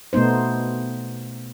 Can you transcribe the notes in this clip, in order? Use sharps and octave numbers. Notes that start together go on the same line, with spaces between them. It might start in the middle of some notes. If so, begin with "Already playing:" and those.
B2 A3 B3 D#4 C5